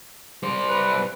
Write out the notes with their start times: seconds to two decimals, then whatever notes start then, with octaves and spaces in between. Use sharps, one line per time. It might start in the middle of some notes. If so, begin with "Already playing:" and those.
0.43 G3 C5
0.69 B4